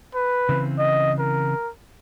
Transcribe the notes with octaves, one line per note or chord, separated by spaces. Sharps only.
B4
C#3 E3 C4
D#5
A#4